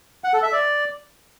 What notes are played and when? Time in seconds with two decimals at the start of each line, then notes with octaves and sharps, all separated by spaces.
0.24 F#5
0.34 A4
0.43 E5
0.52 D5